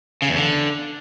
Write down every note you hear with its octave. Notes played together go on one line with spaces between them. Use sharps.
C#3
E2
D3